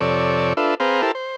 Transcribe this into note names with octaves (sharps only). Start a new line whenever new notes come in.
F2 C3 A4 C#5 D5
D4 F4 A4 B4 E5
C4 G#4 B4 C5 F5 A#5
E4 G4 A4 A#4 C5 A5
C5